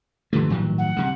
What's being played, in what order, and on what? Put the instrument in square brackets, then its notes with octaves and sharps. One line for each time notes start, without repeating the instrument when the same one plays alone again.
[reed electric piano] G2 A#2 F3 [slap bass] D3 E3 A3
[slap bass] A2 D#3 F#3
[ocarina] F#5
[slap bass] C3 G3